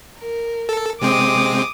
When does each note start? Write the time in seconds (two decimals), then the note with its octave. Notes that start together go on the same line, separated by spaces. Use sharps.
0.19 A#4
0.69 A4
1.02 C3 G#3 C4 D6 D#6